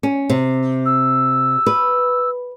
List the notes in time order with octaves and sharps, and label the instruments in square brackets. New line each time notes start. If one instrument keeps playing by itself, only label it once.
[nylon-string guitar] C#4
C3
[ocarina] E6
[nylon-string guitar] B4